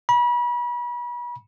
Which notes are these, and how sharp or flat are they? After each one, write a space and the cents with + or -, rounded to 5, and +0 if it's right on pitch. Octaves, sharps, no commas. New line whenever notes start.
B5 -35